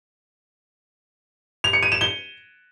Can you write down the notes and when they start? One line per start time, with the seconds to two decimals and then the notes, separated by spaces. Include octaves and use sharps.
1.64 F7
1.73 C#7
1.83 D#7
1.92 E7
2.01 G7